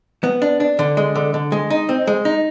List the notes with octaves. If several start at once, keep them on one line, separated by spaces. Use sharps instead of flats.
B3
D4
D4
D3
G#3
D3
D3
G#3
D#4
C4
G#3
D#4